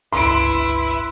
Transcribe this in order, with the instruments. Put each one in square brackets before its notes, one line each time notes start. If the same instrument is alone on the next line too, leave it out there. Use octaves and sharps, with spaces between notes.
[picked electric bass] G1 C#2 D4 [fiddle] E4 [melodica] B4 E5 [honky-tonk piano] C6 D7